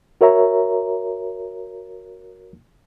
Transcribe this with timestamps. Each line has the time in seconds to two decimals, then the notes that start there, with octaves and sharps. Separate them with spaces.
0.21 F#4 A#4 C#5 E5 A#5